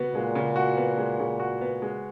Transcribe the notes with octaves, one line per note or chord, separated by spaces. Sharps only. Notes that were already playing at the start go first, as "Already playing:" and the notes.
Already playing: C#3 B3 F#4
A#2 G#3
C#3
F#4
B3
G#3
C#3
F#4
B3
G#3